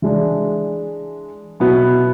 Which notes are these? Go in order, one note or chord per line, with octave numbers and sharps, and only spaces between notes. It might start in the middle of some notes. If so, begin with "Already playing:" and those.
E3 G#3 D4
B2 F#3 B3 E4